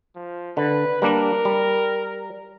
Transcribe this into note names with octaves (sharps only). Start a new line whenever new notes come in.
F3
D3 B4
G3 A#3 D4 A#4
G3